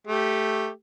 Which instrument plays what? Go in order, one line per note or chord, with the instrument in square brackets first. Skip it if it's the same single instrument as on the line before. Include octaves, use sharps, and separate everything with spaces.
[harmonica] A3 G4